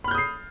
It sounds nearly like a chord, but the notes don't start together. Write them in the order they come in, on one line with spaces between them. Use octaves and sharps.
B5 F6 G6 D#6 C7